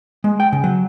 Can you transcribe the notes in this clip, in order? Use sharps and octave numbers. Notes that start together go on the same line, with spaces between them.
G#3
G5
C#3
F#3